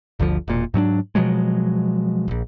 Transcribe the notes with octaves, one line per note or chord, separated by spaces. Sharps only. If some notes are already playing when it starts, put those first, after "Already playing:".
G1 D2 D3 F3
E1 A#2
G#2 F#3 C#4 D4
B2 F3 F#3 G#3
D#1 A#1